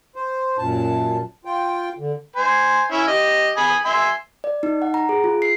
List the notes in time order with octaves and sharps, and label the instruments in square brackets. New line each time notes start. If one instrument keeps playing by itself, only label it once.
[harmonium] C5
F#2 A#2 A5
F4 G5
D3
[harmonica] C5 G#5
C#4 E4
G4 D#5
G#5 B5 D#6
E5 G#5 C6
[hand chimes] D5
D#4
F#5
A#5
G#4
F4
C7